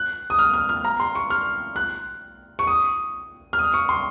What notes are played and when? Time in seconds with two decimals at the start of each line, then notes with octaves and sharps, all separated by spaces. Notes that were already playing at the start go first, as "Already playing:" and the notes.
Already playing: F#6
0.30 D#6
0.39 F6
0.54 F6
0.69 F6
0.84 A#5
1.00 C6
1.15 C#6
1.30 F6
1.76 F#6
2.59 C#6
2.67 D#6
3.53 F6
3.59 D#6
3.74 C#6
3.89 C6